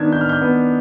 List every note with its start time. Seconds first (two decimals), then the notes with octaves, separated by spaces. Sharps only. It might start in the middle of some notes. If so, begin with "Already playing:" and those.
Already playing: D#3 B3 D4 G#6
0.12 D#3 G6
0.21 F6
0.29 G6
0.41 B3